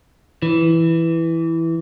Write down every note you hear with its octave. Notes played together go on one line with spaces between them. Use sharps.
E3